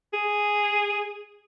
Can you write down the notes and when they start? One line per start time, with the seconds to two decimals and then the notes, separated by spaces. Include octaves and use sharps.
0.13 G#4